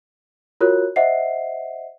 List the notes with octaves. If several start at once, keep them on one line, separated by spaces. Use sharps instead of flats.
F4 F#4 A#4 C#5 F#6
C5 D#5 E5 F#5 C7